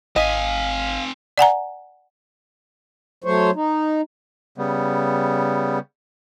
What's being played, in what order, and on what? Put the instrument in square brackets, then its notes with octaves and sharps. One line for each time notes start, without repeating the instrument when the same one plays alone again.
[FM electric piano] G#1 B6 [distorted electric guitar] C4 G#5 [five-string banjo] D#5 [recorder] F5
[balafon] D5 F#5 G#5 A#5
[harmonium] F#3 A3 C5 C#5
D#4
[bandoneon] C#3 G3 B3